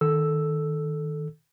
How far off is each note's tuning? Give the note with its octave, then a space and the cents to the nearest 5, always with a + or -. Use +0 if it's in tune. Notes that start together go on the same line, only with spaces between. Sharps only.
D#3 +0 A4 -10 E6 +0